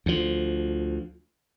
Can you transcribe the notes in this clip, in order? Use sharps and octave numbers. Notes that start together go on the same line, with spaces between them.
D2 F3